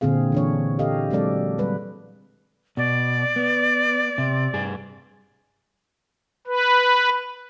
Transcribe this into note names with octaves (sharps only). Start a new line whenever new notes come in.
A#2 D3 C4 G#4 F5
E3 D4 C#5
G4 A4 D#5 F5
F#3 G#3 C4 A4 D5
G3 B4
B2 D5
B3
C3
G2 G#4
B4